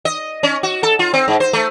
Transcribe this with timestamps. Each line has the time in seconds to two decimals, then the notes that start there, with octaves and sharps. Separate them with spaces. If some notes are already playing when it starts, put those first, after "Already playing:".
0.05 D#5
0.43 C#4
0.63 F#4
0.83 A4
0.99 F4
1.14 C4
1.28 G#2
1.40 C5
1.53 A3